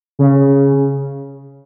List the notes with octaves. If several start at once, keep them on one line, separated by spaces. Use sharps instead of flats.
C#3